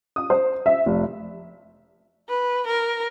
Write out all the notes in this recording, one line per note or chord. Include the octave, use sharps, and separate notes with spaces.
D#6
C5
E5
F1
B4
A#4